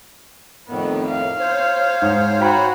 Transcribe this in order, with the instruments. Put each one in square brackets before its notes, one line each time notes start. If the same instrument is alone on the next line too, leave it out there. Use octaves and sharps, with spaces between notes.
[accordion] F2 A2 D#3 [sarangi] B3
[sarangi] F5
[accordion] C5 C#5
[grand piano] G#2
[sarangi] F#4 [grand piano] G5 A#5 B5